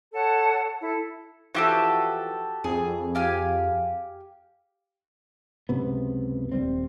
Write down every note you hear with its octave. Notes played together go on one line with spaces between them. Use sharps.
A4 C#5 F#5 A5
E4 A4
E3 F3 F#4 G4 A4
F2 G#4
G4 F5 G#5
C#2 F#2 C3 B3
D#1 G3 C4